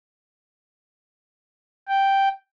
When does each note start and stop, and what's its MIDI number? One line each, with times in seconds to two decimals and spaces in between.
1.89 2.29 79